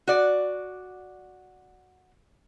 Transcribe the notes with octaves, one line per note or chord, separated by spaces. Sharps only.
F#4 D5